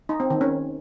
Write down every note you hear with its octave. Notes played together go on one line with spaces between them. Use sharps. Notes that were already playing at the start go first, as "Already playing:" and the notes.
D#4
C4
D#3
C#4